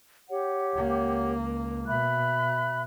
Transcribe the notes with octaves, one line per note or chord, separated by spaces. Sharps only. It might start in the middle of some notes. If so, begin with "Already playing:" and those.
G4 C#5 F#5
C#2 A#3
B2 E5 B5 F#6